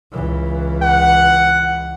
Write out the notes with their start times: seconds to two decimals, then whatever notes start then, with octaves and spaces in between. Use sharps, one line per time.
0.11 C#2 E3
0.82 F#5